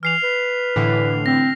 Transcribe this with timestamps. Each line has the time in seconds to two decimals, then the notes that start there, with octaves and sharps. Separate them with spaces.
0.03 E3 F6 C7 F7
0.23 B4
0.76 A2 D3 E3
1.26 C4 A#6